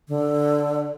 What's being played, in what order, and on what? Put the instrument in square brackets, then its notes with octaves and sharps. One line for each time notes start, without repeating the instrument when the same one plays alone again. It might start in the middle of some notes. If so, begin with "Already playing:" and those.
[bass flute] D3